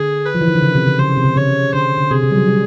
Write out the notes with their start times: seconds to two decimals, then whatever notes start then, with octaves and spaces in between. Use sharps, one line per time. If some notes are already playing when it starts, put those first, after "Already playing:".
Already playing: D3 G#4
0.25 B4
0.35 F3
0.41 E3
0.48 D#3
0.55 D3
0.62 C#3
0.75 C3
0.86 C#3
0.99 C#3 C5
1.17 C3
1.24 C#3
1.36 C#3 C#5
1.74 D3 C5
1.98 D3
2.11 C3 G#4
2.24 C#3
2.31 G3
2.36 F#3
2.48 G3